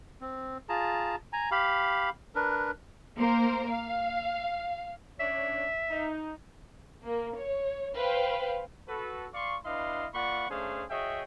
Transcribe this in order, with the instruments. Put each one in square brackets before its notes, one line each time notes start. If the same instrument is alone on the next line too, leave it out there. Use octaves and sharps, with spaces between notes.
[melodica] C4
F4 G#4 A5 A#5
G#5 A#5
G4 F5 B5
D4 A#4 B4
[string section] A#3 A#4 C5
F5
[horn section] C#4 D4 C#5 [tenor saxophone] E5
[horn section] D#4
[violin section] A#3
C#5
B4 C5 F5 G5
[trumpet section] F#4 A4 B4
D5 F5 C6 C#6
D4 E4 B4 D#5 F5 C6
A#3 F4 D5 F#5 B5 C#6
A3 C#4 D4 G#4 C5 F5
F#4 G#4 C#5 D#5 E5 G5